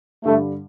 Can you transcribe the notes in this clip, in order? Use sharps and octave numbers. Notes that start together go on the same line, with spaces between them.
G2 D3 G3 A3